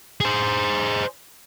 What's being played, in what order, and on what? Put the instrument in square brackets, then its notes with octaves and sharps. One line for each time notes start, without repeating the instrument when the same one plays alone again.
[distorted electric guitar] G#4 C5